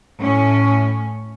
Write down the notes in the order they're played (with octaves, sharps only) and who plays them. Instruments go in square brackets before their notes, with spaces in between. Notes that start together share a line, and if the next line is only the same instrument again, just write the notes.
[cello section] A2 C#4